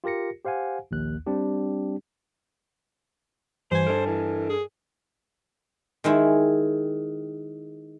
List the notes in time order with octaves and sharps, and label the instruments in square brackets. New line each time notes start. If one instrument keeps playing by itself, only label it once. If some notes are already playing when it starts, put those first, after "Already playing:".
[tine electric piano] F4 G4 A#4 A#6 C#7
G4 C5 F5 F#5 G#5
A#1 D#2 F#6
G3 C4 D4 G4
[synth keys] G2 G#5 [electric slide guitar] E3 [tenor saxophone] C5
[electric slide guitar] D4 A4 A#4
[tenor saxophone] E3
G#4
[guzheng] D#3 G#3 E4